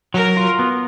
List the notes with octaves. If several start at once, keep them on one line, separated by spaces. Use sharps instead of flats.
F#3 A#4
F4
B3